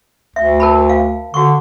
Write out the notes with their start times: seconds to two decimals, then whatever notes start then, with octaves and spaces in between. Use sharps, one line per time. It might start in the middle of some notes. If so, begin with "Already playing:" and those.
0.36 D2 E5
0.60 A#4 A5 B5
0.89 F5
1.34 D3 F#4 C#6